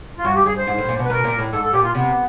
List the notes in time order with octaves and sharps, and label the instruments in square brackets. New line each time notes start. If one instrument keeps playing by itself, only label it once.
[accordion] F4
[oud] G2 [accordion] F#4
[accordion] G4
[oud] G2 [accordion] G#4
[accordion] C5
[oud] G#2
A2
A#2
B2
[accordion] B4
[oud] B2 [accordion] A#4
[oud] A#2
A2
[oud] G#2 [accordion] A4
[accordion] A4
[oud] A#2 [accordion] G4
[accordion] F4
[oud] C3 [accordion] B3